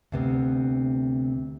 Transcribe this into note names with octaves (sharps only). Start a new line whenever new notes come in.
D2 C3 B3